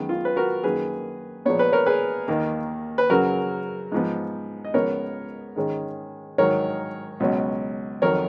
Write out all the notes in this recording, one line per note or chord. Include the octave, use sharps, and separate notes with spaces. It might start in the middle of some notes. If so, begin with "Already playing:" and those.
Already playing: F#2 D#3 G#3 B3
F4
B4
F#4 A#4
F#2 D#3 A#3 G#4 B4
A#2 F3 G#3 B3 C#5
B4
A#4 C#5
G#4 B4
D#2 D#3 A#3
B4
F#2 C#3 F#3 F#4 A#4
G#2 F3 B3
D#5
C#2 C#3 F3 B3 A#4 C#5
G#2 D#3 G#3 C#4
G#2 D#3 F#3 A#4 C#5
C#2 B2 F#3 C#4
F2 D#3 F#3 A#4 C#5